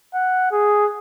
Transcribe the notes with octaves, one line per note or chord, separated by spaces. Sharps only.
F#5
G#4